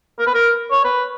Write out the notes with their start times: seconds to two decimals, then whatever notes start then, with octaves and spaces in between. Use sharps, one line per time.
0.19 A#4
0.27 B4
0.35 A#4
0.71 C#5
0.84 B4